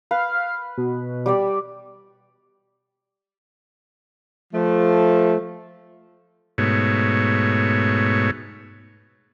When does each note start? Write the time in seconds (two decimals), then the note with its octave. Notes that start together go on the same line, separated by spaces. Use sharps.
0.11 B4 F5
0.78 B2
1.26 G3 G4 D5
4.53 F3 A3
6.58 G#2 B2 A3 C#5